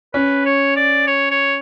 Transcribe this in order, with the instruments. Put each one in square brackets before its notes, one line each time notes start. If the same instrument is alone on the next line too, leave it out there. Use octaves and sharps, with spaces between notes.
[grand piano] C#4 [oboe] B4
[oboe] C#5
D5
C#5
C#5